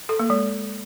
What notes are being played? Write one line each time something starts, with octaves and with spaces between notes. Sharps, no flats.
A4
A#3
G#3